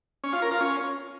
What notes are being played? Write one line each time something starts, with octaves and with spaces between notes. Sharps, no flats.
C#4
F4
A#4
F4
C#4